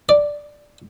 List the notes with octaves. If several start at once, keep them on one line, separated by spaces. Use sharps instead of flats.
D5